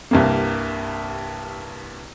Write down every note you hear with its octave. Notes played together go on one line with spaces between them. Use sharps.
C2 G2 A#3